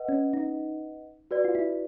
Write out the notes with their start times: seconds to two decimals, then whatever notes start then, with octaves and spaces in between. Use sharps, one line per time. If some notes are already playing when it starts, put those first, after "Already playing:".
Already playing: B4 D#5 F#5
0.09 C#4
0.34 D#4
1.31 F#4 B4 D5
1.44 F4
1.55 E4